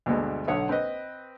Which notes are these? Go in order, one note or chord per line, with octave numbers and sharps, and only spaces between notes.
D2 G2 B2 G#3 A3
B1 D3 C#5 F#5 D#6
C4 B4 D#5